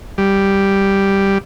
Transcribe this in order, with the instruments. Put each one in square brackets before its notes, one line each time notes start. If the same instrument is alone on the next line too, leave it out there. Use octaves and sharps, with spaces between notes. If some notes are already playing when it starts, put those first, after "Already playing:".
[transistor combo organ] G3